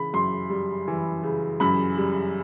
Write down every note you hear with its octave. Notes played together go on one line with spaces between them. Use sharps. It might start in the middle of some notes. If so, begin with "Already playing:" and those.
Already playing: C#3 E3 B5
F#2 C6
G3
E3
C#3
F#2 B5
G3